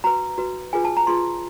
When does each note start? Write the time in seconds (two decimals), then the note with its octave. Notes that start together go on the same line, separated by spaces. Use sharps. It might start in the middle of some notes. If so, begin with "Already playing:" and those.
0.04 F#4 B4 A#5
0.38 F#4 B4
0.73 F4 G#4 B4 G#5
0.84 A5
0.97 A#5
1.07 F4 G#4 B4 C6